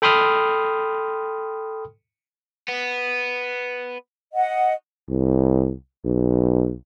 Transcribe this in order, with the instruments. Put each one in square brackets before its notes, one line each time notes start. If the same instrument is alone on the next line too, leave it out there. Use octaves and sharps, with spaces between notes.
[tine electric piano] A4 G5 B5 C6 D#6 F6
[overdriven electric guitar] B3
[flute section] D#5 F#5
[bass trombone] C2
B1